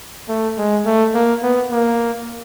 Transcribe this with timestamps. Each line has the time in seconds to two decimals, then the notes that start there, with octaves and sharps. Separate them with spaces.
0.29 A3
0.58 G#3
0.85 A3
1.14 A#3
1.43 B3
1.71 A#3